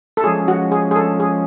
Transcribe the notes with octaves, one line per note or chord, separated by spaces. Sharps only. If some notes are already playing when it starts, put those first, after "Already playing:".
A4
F3 G#3 C#4 G#4
F#4
G#4
G#4
A4
G#4